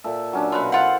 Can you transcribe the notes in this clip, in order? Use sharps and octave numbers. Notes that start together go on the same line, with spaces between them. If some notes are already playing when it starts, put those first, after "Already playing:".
A#2 A4 E5
F#3 C#4 D4
B2 F4 F#4 B4 C#5
E4 F4 C5 F5 F#5